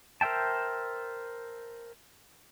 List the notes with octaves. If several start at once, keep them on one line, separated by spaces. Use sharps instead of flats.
A#4 C5 E5 G5 A5